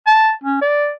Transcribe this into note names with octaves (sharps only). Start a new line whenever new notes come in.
A5
C#4
D5